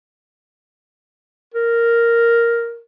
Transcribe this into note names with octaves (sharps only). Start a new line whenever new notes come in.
A#4